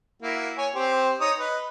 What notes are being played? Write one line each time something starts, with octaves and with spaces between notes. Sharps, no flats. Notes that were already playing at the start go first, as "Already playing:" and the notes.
A#3 E4 F#4
C#5 G#5
C4 G4 C5
D#4 C#5 D#6
B4 D#5